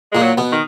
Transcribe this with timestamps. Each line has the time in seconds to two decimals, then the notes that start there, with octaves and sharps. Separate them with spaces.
0.12 A#2 G#3 A#3
0.23 F#3
0.38 B2 B3
0.52 D#3